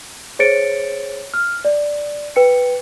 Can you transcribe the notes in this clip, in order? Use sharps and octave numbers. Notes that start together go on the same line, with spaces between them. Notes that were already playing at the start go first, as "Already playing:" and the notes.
G#4 C5 C#5 A6 C#7 D7
F6
D5
B4 G5 C#7